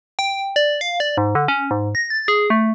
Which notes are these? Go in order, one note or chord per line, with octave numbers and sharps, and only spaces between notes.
G5
D5
F5
D5
G#2
D3
C#4
G#2
A#6
A6
G#4
A3